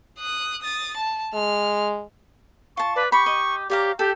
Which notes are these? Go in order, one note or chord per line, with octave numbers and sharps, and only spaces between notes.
D#6 F#6
D#6 A6
A5
G#3 F6
F4 A5 C#6
B4 D5
G4 B5 C#6
D#5
G4 C#5 D5 F5 A#5
G4 A4 G5